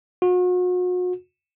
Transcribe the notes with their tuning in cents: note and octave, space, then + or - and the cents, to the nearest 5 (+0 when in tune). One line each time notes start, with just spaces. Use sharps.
F#4 -40